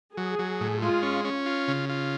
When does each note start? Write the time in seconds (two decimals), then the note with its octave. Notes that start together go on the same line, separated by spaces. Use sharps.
0.17 F#3 G#4
0.39 F#3
0.61 A2
0.82 G#3 F4
1.03 C#4
1.25 C#4
1.46 F4
1.68 C#3
1.89 F4